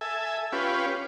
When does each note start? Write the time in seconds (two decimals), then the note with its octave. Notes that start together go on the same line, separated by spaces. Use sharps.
0.01 A4 E5 G#5
0.52 C#4 F4 G4 B4